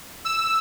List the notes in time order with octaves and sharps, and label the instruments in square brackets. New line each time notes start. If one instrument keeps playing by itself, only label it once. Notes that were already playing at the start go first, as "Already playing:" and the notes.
[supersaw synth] E6